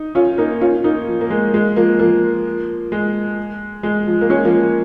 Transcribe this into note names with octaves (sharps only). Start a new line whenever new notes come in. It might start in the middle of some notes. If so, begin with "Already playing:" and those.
Already playing: D#4
C#4 F4
A#3 D#4
C#4 F4
A#3 D#4
F3
A#3
G#3
G#3
F3 A#3
F3 A#3
G#3
G#3
F3
A#3
G#3 C#4
F3 A#3
F3